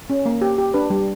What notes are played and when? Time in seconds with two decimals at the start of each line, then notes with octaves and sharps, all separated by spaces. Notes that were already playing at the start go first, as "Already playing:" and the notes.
0.10 C#4
0.26 A#3
0.42 G4
0.58 G4
0.74 D4 B4
0.90 G3